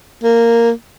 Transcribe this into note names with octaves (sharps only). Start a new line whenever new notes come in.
A#3